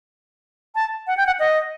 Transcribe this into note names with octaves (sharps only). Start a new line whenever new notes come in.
A5
F#5
G5
F#5
D#5